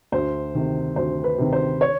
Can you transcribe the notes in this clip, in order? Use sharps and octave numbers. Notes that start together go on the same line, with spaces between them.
D2 C5
C3 D#3
D2 C5
B4
C3 D#3
C5
C#5